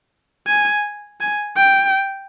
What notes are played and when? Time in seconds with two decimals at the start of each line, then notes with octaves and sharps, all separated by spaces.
0.47 G#5
1.21 G#5
1.57 G5